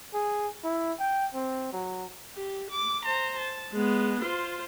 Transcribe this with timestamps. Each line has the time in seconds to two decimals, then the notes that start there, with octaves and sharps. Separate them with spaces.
0.14 G#4
0.64 E4
1.00 G5
1.34 C4
1.73 F#3
2.35 G4
2.70 D6
3.05 C5 A#5
3.39 A5
3.73 G#3 B3
4.22 F4 C5